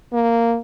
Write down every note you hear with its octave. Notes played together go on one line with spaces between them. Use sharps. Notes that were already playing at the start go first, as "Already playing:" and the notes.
A#3